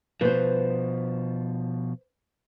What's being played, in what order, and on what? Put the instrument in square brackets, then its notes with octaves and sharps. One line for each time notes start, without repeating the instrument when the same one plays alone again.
[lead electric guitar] B2 F3 [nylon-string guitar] B4 C5